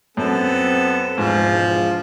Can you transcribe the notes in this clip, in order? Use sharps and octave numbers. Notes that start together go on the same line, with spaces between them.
F#2 B3 C4 A4
E1 G#2 F3